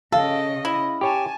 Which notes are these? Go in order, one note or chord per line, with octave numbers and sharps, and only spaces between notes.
C#3 A4 D#5 F5
E4
G4 C#5 G#5 A5